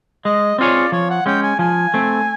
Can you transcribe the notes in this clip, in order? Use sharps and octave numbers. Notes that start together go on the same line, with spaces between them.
G#3 D#5
C4 F4 G#4 C#5 D5
F3 C#5
F#5
G#3 C#4 G5
G#5
F3 G#5
A3 C4